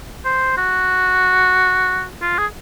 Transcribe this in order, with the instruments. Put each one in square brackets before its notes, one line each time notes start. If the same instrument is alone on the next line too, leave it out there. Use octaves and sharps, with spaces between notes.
[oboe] C5
F#4
F4
G#4